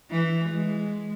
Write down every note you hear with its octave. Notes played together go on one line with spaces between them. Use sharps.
E3
G#3